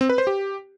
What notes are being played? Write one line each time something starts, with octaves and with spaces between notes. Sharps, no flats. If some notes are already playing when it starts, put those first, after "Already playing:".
C4
B4
C5
G4